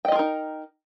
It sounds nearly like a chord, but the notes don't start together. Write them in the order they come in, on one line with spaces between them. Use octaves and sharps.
G5 D#5 F4 A#4 D#4